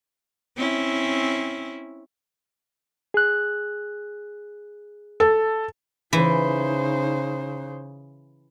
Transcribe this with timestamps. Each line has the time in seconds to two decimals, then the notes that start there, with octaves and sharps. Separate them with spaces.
0.57 C4 C#4 E4
3.14 G#4 F#6
5.20 A4
6.13 C#3 E3 D#4 C5